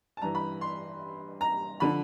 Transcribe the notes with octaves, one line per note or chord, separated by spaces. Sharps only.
A5
G2 E3 A#5
B5
C6
A#5
D3 F3 B5